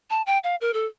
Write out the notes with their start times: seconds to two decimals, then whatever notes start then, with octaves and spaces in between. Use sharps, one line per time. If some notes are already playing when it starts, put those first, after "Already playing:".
0.10 A5
0.26 G5
0.44 F5
0.61 A#4
0.74 A4